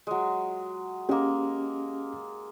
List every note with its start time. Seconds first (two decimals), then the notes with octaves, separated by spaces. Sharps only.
0.07 F#3 G#3
1.09 G#3 A#3 C#4 G4